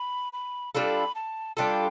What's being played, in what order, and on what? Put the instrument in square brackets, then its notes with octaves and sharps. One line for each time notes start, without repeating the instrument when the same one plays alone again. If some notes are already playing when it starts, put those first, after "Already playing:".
Already playing: [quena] B5
B5
[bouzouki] G3 D4 F4 A4 [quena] B5
[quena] A5
[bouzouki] G3 D4 F4 A4 [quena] G5